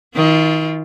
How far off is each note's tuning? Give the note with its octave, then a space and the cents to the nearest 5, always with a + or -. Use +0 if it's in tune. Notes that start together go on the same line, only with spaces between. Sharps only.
D#3 +30 F4 -15